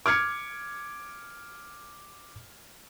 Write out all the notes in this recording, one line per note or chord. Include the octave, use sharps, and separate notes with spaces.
D6 F6 G#6 C#7